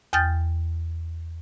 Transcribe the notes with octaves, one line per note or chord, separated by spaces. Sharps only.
E2 G5 D#6 F6 G6 A6